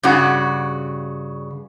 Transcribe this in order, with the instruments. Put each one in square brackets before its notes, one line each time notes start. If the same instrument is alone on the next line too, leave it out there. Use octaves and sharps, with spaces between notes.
[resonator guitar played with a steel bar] G2 C#3 F#4